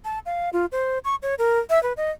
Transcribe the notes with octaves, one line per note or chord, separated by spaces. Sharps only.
A5
F5
F4
C5
C#6
C#5
A#4
E5
B4
D#5